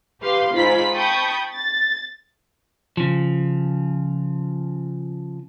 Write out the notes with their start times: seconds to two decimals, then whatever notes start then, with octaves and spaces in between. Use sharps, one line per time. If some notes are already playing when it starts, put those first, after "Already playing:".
0.23 G4 B4 F5 C6
0.54 G#2 F4 B5 B6
0.95 G5 A5 B5 C#6 D#6 G6
1.54 A6
2.97 C#3 F3